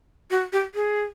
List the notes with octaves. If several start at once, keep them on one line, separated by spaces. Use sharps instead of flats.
F#4
G4
G#4